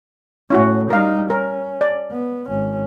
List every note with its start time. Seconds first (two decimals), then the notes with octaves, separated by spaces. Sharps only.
0.50 A2 A3 C#4 E4 F#4
0.90 G3 D#4 A#4 F5
1.30 C#4 A#4
1.81 D5
2.11 B3
2.49 G#1 C#4